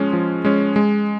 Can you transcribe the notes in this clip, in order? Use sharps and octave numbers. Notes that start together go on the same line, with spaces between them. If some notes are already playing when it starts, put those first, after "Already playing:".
Already playing: F3 G#3 C#4
F3
G#3 C#4
G#3